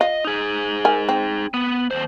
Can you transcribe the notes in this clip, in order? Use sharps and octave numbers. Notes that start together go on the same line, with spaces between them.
F4 D#5
D#4 G#4
A#4 G#5
C4
B3
D#2 C5